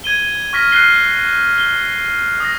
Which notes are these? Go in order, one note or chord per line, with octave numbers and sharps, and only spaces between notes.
G#6 D#7 G7
C#6 F6 A#6 B6
F6 F#6 B6 C7 G7
G7
D#6 A#6